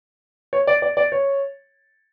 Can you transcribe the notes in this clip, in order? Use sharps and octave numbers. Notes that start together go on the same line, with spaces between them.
C#5
D5
D5
D5
C#5